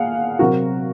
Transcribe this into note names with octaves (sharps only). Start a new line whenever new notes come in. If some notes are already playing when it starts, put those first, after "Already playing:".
Already playing: A#2 G#4 F5 F#5
C3 F#3 C4 F#4 A#4